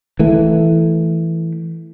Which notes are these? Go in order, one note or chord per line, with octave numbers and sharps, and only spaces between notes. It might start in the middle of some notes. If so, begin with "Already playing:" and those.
E3 A3